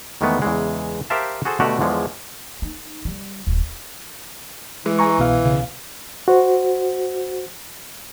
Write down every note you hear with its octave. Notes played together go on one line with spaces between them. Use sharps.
E2 D#3 E3 G#3 A3 B3
E2 C#3 E3 G#3
G4 A#4 C5 E5 F5 A5
F#4 G#4 A4 C5
B2 D3 A3 D4 F#4 G4
E2 D3 F3 G#3 C#5
D#4
G3
D#1
E3 G#3
G#5 A#5 C#6
C2 B2 F5
C#3
F#4 C5